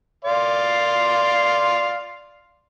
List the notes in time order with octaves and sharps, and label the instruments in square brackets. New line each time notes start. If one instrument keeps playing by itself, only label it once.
[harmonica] D5 F5 C6